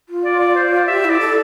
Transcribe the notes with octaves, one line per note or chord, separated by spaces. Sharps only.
F4
D5
D5
C5
D5
G4 E5
E4
D5
A4